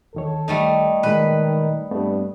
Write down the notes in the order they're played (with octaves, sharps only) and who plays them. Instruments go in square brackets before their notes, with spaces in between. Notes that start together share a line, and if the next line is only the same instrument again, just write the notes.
[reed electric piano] D2 D#3 C#5 [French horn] A4
[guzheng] G3 A3 D#4
[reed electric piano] A#2 G#3 [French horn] D#3 [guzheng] B4
[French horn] G2 [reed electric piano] A3 B3 C4